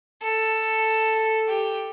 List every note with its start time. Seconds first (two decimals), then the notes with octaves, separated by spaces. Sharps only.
0.23 A4
1.48 G4